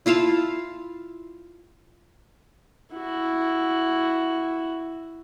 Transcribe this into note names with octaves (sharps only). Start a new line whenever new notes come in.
E4 F4 F5 A5
E4 F#4